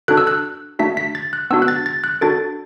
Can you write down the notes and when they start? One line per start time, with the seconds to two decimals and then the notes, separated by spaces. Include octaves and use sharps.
0.08 D4 F#4 A4 F#6
0.17 E6
0.27 F#6
0.79 A3 D4 F#4 B6
0.97 B6
1.15 A6
1.33 F#6
1.50 B3 D4 F#4 E6
1.62 F#6
1.68 A6
1.86 A6
2.04 F#6
2.21 D4 F#4 A4 A6